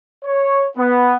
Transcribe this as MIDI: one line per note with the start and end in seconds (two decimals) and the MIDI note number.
0.24 0.66 73
0.78 1.16 59